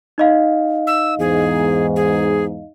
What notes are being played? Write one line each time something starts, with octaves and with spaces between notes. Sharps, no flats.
D#4 D#5 F5
E6
E2 G#2 G#4
G#4